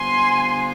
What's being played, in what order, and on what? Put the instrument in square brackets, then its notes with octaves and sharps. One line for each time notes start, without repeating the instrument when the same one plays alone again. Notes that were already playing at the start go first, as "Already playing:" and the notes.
Already playing: [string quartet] D3 G3 B3 F4 C5 [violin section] G#5 C6